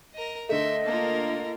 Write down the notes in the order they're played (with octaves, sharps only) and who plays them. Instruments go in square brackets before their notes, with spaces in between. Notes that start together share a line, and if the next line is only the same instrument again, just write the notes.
[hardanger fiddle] A#4 D#5
[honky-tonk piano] D3 A3 [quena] D#5 [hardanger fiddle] E5 C6
[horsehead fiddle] A#3 F4 [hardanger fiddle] A4 A#4